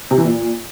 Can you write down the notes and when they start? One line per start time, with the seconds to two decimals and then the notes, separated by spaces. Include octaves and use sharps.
0.11 C3
0.18 E3
0.25 A#2